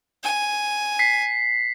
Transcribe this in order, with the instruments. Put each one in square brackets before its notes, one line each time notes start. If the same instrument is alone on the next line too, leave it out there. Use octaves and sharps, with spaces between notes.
[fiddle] G#5
[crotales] B6 C7